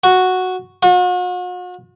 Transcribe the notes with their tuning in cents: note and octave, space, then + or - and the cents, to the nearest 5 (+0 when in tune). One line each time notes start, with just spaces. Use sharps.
F#4 -5
F#4 -45